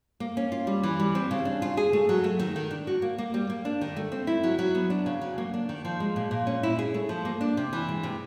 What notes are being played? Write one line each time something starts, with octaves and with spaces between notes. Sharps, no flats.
A#3
C#4
F4
G3
E3
G3
C4
C#3
D4
F4
G#4
A3
F#3
A3
D#3
D#3
D4
F#4
A#3
A#3
G3
A#3
D4
D#3
A3
C4
E4
F#3
F#3
B3
D4
C#3
F#3
A#3
D4
D#3
F3
G#3
A#2
A#2
C#4
E4
G#4
A3
F3
A#3
D4
C3
E3
G#3
C3